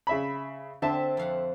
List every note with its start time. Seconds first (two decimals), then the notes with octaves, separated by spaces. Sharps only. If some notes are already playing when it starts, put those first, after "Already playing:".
0.07 C#3 E5 B5
0.82 D3 C4 E5 A5
1.17 F2 F5 F#5